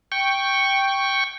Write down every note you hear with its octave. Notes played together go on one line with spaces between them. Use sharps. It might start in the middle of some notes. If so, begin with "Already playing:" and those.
G5 C#6